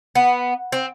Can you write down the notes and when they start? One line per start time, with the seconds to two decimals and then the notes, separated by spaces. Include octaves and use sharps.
0.15 B3
0.72 C4